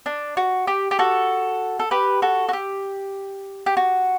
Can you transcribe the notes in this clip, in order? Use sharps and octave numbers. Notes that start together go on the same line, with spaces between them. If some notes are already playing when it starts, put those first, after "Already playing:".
D4
F#4
G4
G4
F#4 A4
A4
G4 B4
F#4 A4
F#4
G4
G4
F#4